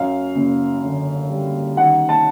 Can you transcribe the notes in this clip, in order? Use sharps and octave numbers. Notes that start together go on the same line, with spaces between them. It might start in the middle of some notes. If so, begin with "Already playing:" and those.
Already playing: F#2 F5
F#1
D3
G3
D#3 F#5
A5